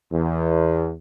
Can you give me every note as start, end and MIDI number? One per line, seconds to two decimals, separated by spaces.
0.12 0.93 40